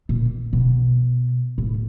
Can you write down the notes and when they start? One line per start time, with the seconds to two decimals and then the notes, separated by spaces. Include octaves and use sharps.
0.09 A#2
0.53 B2
1.58 A2